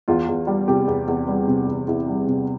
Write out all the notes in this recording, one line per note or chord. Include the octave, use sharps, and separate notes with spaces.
E2 F4
E2
G3
C3 G4
E2
E2
G3
C3
E2
E2 E4
G3
C3